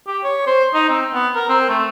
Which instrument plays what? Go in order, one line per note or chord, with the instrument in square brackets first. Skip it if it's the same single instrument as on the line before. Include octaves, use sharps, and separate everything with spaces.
[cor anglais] G4
C#5
C5
D#4
C4
B3
A#4
C4
A3